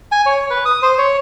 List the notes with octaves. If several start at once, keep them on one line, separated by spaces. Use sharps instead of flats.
G#5
C#5
B4
D#6
C5
C#5